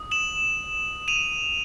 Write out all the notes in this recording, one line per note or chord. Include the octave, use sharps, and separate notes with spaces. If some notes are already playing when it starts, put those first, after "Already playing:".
Already playing: D#6
E7 F#7
D#7 F7